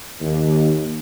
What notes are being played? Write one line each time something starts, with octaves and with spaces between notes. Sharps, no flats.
D#2